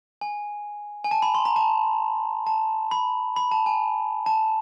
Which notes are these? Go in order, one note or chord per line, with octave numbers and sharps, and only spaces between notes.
G#5
G#5
A5
B5
C6
A#5
A5
A5
B5
B5
A5
G#5
A5